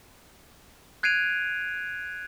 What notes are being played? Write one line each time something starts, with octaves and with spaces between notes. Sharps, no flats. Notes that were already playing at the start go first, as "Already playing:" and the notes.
F#6 G#6 C7 D7 D#7 F7